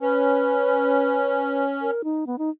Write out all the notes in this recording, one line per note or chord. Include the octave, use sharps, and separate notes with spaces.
C#4 B4
A#4
D#4
B3
D#4